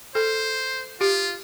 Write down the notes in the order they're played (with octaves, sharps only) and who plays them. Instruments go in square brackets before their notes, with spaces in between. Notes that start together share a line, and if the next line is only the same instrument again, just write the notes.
[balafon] A4 [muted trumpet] C5
[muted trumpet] F4 [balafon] G4